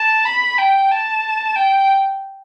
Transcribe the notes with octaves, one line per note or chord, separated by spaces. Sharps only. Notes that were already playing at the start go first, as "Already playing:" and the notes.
Already playing: A5
B5
G5
A5
G5